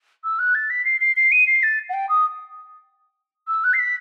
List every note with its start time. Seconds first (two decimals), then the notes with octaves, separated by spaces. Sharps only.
0.24 E6
0.39 F#6
0.55 A6
0.70 B6
0.85 C7
1.01 C7
1.16 C7
1.32 D#7
1.47 C7
1.63 A6
1.89 F#5
1.94 G5
2.09 D#6
3.48 E6
3.64 F#6
3.73 C7
3.79 B6